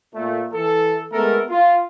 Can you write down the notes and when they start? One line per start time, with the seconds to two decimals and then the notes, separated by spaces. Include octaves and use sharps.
0.14 A#2 A3
0.53 E3 A4
1.13 G#3 A3 B3 A4 A#4
1.50 F4